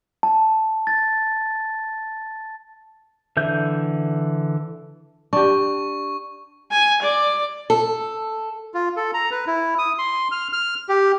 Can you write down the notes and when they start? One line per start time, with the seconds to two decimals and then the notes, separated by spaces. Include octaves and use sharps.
0.23 A5
0.87 A6
3.37 D3 E3 E5 G6
5.33 D4 G4 C#6
6.71 G#5
7.02 D5
7.70 A4
8.74 F4
8.96 A4
9.14 A#5
9.31 B4
9.47 E4
9.78 D#6
9.98 C6
10.31 F6
10.53 F6
10.89 G4